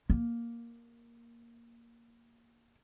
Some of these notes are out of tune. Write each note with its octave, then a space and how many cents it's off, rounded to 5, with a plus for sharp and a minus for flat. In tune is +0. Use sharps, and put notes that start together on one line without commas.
A#3 +5